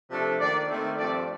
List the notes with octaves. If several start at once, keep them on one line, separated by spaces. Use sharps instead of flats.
C3 F3 A3 D4
D#3 A#3 D4 D5
D#3 A3 C4
G2 F3 A3 C4 D5